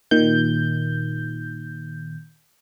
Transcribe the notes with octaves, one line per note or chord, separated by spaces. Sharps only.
A#2 D#3 G6